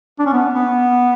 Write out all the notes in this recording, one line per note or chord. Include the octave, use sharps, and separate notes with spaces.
D4
C#4
B3
B3